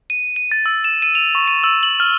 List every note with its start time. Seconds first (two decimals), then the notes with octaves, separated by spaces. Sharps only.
0.10 D#7
0.36 D#7
0.52 A6
0.66 E6
0.84 E7
1.02 D#7
1.15 F7
1.35 C#6
1.48 D#7
1.64 E6
1.83 F#7
2.00 F6